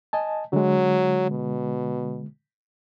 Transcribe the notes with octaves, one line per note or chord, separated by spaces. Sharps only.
D#5 G#5 A5
D3 F#3 G#3
B2